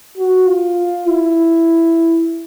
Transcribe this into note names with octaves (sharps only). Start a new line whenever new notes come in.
F#4
F4
E4